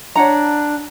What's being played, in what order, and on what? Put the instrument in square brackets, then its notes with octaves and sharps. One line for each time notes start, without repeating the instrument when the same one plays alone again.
[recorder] D4 [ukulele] C#5 F#5 A#5